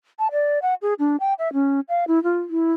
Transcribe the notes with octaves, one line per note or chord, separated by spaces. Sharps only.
A5
D5
F#5
G#4
D4
G5
E5
C#4
F5
E4
F4
E4